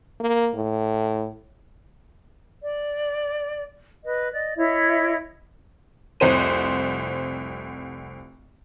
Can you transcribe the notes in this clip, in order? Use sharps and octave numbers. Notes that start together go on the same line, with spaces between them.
A#3
A2
D5
B4 D#5
D5 D#5
E4 C#5 D#5 E5
F1 C2 C5 D#7